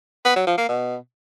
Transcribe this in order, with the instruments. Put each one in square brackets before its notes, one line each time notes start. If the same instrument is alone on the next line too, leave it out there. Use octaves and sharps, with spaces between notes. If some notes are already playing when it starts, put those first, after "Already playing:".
[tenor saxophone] B3
F#3
F3
A#3
B2